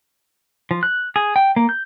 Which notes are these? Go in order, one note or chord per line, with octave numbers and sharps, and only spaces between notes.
F3
F#6
G#4
G5
A#3
G6